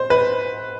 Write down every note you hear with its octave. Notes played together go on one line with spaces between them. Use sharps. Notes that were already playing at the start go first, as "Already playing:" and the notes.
Already playing: C5
B4